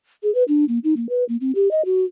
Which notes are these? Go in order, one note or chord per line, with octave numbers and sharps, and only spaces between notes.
G#4
B4
D4
A#3
D#4
A#3
B4
A#3
C4
G4
D#5
F#4